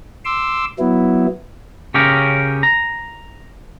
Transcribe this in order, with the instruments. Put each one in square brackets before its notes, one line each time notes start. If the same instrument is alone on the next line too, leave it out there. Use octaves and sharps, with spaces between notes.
[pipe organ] C6 D6 E6
F#3 B3 E4
[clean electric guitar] C#3 C#4 G4 A#4
A#5